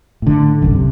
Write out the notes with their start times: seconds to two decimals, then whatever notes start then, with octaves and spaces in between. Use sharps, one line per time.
0.22 A2 D3
0.62 C2 F#2
0.75 C3